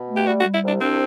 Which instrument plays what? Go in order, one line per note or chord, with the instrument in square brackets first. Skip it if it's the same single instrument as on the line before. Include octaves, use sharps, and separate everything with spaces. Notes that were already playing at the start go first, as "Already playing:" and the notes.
Already playing: [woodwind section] B2
A3
[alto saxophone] G4
[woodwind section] G3 [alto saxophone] F#4
[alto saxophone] F#4
[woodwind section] G3
[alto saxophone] E4
[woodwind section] C2 [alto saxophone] D4
[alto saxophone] C4 [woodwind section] D4